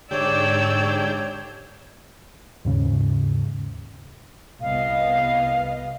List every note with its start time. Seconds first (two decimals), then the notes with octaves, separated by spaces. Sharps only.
0.11 G#2 D3 G4 C#5 D5 G5 E6
2.65 D#2 G#2 C#3
4.61 C2 B3 D#5 F5